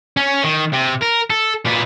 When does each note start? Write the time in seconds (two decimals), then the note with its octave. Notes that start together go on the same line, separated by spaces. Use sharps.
0.17 C#4
0.44 D#3
0.74 C3
1.03 A#4
1.30 A4
1.65 A#2 B3